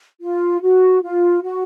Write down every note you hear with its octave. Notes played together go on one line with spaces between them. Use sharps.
F4
F#4
F4
F#4